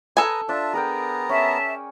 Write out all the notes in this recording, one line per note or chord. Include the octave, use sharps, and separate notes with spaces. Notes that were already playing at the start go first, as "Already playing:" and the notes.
A4 B4 G#5 A#5 D#6
D4 F4 E5 A5
B3 G#4 A#4 G5 A#5
C#4 E5 A5